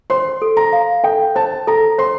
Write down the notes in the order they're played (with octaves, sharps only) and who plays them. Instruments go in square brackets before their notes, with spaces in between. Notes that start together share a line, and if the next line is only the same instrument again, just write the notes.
[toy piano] C5 [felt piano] C6
[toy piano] A4
[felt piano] A#5
[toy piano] F5
[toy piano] A4 [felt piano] G5
[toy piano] C5 [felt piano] A5
[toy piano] A4 [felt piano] A#5
[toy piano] C5 [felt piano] C6